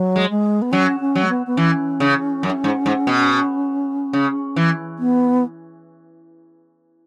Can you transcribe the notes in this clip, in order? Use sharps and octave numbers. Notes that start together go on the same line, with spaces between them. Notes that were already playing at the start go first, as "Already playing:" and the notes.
Already playing: F#3
G#3
G#3
B3
F#3 C#4
C#4
F#3
G#3
B3
B3
E3 C#4
C#3
F#2
G#2
G#2
B2
C#3
E3
B3